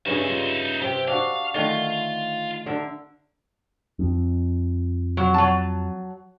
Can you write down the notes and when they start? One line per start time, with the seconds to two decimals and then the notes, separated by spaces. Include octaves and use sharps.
0.06 G2 C#3 D#4 G#4 E5
0.29 F4
0.82 C3 G4 E5 G5
1.08 D4 F#4 F5
1.55 D3 D#3 A3 F4
2.66 D3 A#4 E5
3.99 F2
5.17 F#3
5.34 F#3 A5